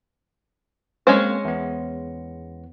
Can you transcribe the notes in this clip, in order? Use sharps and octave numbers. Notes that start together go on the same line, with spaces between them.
G#3 A#3 C4 C#4 C5
E2 B3